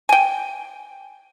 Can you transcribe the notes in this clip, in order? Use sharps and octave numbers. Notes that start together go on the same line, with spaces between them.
G5 G#5